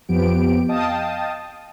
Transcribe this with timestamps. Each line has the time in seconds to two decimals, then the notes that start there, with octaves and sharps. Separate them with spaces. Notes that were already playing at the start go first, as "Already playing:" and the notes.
0.08 F2 F3 B3 G4 D7
0.69 D#5 F5 G5 A5 D#6